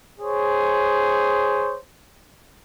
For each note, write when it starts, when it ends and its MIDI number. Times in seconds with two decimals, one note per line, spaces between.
0.20 1.76 68
0.20 1.76 72
0.20 1.76 73